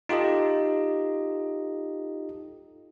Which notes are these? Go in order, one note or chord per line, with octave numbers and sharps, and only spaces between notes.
D#4 F4 G4 A4 D#5